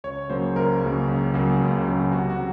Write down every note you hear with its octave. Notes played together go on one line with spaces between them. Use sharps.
C#2 C#5
C#3 F#3 A#3 C5
C#2 A#4
C#3 F#3 A#3
C#2
C#3 F#3 A#3
C#2
C#3 F#3 A#3
C3 F#4
F#4
F#3